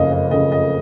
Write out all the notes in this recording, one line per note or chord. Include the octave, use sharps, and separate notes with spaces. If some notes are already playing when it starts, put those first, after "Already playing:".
Already playing: F#1 F2 C#3 D#5 F5
D#5
F#1 F2 C#3 D#5
D#5